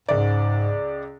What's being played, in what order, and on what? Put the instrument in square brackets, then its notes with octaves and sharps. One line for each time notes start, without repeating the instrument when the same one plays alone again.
[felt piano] C#2 D5 [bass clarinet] G#2